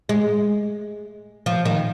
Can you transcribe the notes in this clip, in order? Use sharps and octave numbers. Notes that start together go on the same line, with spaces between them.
G#3
F3
D#3